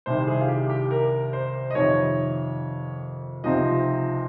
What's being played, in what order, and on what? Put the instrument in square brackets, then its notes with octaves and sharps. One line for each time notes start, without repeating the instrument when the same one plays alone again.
[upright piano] C2 C3 D#3 G3 [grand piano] C5
[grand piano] G#4
F4
G4
G4
A#4
C5
D#5
[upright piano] F2 C3 D#3 [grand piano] C#5
[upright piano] C#2 C3 F3 C4 D#4 [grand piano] D#5